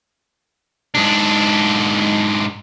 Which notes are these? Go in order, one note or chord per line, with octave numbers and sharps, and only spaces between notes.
G#2 D4